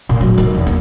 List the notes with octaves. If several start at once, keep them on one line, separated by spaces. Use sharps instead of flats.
A#2
F#3
D#3
E2
A#3